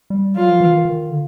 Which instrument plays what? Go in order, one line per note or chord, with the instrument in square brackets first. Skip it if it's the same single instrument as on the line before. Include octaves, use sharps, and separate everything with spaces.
[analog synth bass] G3
[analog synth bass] F#3 [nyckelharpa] F4
[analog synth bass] F3
E3
D#3
D#3
D3